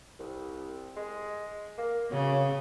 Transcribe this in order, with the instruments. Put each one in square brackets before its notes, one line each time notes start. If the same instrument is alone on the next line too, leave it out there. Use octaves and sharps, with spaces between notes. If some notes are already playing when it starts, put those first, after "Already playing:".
[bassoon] C2
G#3
A#3
[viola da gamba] C#3 [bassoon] F#3